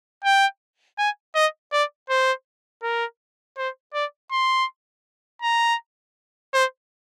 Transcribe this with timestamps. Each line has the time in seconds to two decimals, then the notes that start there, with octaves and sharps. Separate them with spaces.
0.24 G5
0.98 G#5
1.35 D#5
1.72 D5
2.10 C5
2.83 A#4
3.57 C5
3.94 D5
4.32 C6
5.42 A#5
6.53 C5